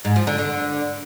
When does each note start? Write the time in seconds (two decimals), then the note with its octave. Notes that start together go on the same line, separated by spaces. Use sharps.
0.05 G#2
0.16 F3
0.27 D3
0.38 D3